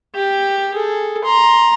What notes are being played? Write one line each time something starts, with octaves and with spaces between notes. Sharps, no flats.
G4
G#4 A4
A#5 C6